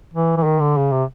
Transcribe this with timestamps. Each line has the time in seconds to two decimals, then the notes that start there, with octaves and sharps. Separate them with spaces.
0.14 E3
0.37 E3
0.45 D#3
0.61 D3
0.77 C#3
0.92 C3